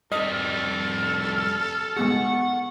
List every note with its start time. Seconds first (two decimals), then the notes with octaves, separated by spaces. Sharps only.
0.12 F2 G3 A4 D#5 F6
1.97 G#3 B3 G#4 F#5 C#6